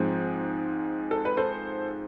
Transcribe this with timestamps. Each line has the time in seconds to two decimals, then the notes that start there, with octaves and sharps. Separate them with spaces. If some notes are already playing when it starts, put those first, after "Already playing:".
Already playing: G#2 F3 G#3 C4
1.11 A4
1.25 B4
1.37 A4 C5